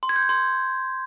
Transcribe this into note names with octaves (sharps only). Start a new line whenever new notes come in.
C6
G#6
G6
G#6
C6